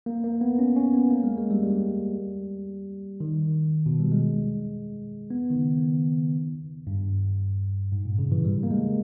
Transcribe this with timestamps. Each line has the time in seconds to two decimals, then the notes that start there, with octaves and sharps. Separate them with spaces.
0.06 A#3
0.24 A#3
0.41 B3
0.59 C#4
0.76 C#4
0.94 B3
1.10 A#3
1.24 G#3
1.38 G#3
1.51 G3
1.63 G3
3.20 D#3
3.86 B2
3.99 G3
4.12 G#3
5.30 B3
5.50 D#3
5.56 C#3
6.87 G2
7.92 G#2
8.05 A#2
8.19 C#3
8.32 E3
8.45 G3
8.63 A#3
8.71 G#3